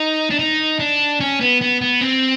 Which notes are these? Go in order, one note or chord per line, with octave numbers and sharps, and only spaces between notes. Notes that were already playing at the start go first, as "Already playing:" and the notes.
Already playing: D#4
D4
D#4
D4
C#4
B3
B3
B3
C4